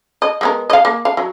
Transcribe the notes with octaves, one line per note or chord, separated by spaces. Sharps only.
D#5
G#3 B3 A#4
D#5 F5
A#3
F5
F#3